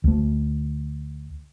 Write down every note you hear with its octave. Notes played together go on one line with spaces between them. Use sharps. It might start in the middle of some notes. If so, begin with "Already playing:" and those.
D2 A3